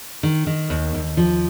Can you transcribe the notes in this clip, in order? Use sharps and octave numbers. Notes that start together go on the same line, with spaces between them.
D#3
D#3
D#2
D#2
F3